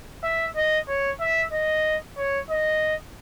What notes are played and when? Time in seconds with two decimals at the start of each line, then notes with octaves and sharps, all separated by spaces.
0.24 E5
0.56 D#5
0.88 C#5
1.20 E5
1.52 D#5
2.17 C#5
2.50 D#5